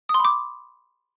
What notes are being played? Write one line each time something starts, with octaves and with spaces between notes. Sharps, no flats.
D#6
C6
B5
D6